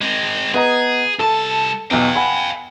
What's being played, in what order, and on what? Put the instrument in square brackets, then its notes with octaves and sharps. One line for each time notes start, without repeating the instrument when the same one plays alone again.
[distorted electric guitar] G#3 C4
[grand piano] B3 D#5 A#5 [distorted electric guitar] G#4
[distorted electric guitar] C2 A5 [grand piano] A4
[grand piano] B1 E2 [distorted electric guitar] F5 G5
[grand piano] F#5 G#5 B5